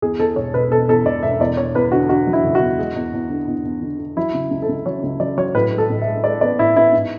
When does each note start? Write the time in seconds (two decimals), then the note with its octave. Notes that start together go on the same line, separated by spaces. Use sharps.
0.02 E2 G#4
0.19 E2 A4
0.36 E1 C#5
0.54 B2 B4
0.71 B2 A4
0.88 E2 A4
1.05 E1 D5
1.23 E1 E5
1.40 E2 D5
1.57 E2 C#5
1.75 E2 B4
1.92 D3 F#4
2.09 D3 F#4
2.27 F#3
2.33 E4
2.44 F#1
2.55 F#4
2.61 E2
2.79 G#3
2.96 E2
3.14 E2
3.30 D3
3.47 E2
3.65 E2
3.82 D3
3.99 D3
4.17 F#3 E4
4.34 C#3
4.51 C#2
4.62 A4
4.69 C#2
4.86 F#3 C#5
5.03 C#2
5.20 F#3 D5
5.37 F#3 C#5
5.55 A2 B4
5.72 G#3
5.78 A4
5.90 A1
6.02 E5
6.07 G#3
6.24 G#3 D5
6.41 B3 D5
6.59 A2 E4
6.76 B3 E4
6.93 G#2